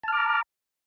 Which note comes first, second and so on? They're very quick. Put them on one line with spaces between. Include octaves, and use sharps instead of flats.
A5 F6 D6 A#5